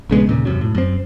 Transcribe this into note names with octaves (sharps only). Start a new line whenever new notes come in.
A#1 C#3 G#3 B3
D#2 A#2 C#3
E1 F#2 C3 F#3
A2
F#2 C4